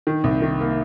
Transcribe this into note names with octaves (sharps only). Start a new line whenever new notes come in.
D#3
C2
D#3
A#3